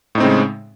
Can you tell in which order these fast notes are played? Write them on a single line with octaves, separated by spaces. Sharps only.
A2 D#4 C4 C#3 G#3